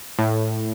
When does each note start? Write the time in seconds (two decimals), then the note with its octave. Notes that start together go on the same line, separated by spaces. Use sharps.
0.19 A2